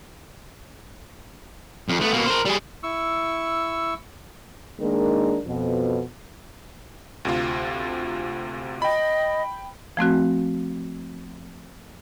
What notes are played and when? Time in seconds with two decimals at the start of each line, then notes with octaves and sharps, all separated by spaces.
1.89 F2
2.01 A3 B3
2.13 B2 A#3
2.26 A#4 C5
2.45 G3 G#4
2.83 E4 C#6 E6
4.80 D#3 G#3 A#3 D4 D#4 A#4
5.46 F2 B2
7.25 D2 C3 F4
8.82 D#5 G5 B5
9.97 F3 A3 C4 F#4